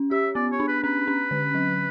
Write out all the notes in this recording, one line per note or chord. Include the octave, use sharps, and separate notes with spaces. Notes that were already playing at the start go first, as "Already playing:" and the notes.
Already playing: C#4
G4 E5
B3 D5
C#5
D4
B4
C#4 B4
C#4
D3
F#3